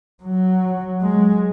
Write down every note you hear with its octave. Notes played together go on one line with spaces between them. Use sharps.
F#3
G#3